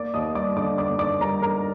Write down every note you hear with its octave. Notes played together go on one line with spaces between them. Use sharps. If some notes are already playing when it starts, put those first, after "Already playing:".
Already playing: A#3 D5 D6
D#2 D#5 D#6
G3 D5 D6
D3 D5 D6
A#3 D5 D6
D#2 D5 D6
G3 A#4 A#5
D3 A#4 A#5